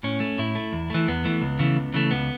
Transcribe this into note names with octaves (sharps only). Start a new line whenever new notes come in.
A2 C#4
A3
A2 E4
A3
E2
E3 A3
E2 B3
E3 A3
C#2
C#3 E3 A3
C#2
C#3 E3 A3
C#2 B3